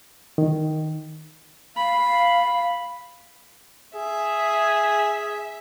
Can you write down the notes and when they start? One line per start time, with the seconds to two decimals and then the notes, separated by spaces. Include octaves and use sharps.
0.38 D#3
1.76 F5 B5
3.96 G#4 E5